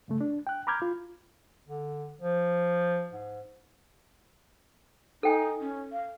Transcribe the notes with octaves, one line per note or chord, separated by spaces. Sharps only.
G2 C#3 A3
D4
G5 F#6
A#5 B5 D6 F6 G6 G#6
F4
D3
F3
G#2
D#4 A4 G5 G#5
C#4
F5